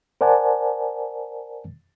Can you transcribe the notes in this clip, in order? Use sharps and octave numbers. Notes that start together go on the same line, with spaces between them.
A#4 C5 D5 F#5 G#5 A5